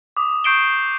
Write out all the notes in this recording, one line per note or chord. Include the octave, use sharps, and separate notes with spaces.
D6 D#6
C#6 G6 C7 D7 E7 G7